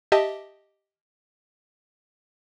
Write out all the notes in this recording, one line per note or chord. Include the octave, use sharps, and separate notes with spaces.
G4 D#5 E5 A5